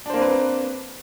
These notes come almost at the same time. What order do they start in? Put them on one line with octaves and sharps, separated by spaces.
D4 C5 A#3 C4 B4